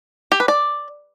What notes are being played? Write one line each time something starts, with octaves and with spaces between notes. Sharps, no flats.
G4
B4
D5